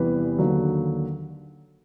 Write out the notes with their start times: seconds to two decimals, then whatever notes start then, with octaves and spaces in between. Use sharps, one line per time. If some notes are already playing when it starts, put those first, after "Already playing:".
Already playing: E2 C3 E3 G3 B4
0.38 D#2 D3 F#3